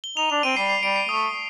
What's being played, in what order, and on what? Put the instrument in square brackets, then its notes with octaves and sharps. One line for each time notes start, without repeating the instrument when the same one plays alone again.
[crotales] G7
[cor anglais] D#4 [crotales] F7
[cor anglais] D4 [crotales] F7
[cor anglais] C4 [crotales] D#7
[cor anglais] G3 [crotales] C7
[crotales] C7
[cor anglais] G3 [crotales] D7
[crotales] C7
[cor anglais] A3 [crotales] D#6